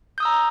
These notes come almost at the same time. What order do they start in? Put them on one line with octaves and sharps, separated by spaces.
G6 D#6 E6 A#5